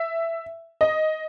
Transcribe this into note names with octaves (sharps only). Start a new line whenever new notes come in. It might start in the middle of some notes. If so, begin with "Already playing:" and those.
Already playing: E5
D#5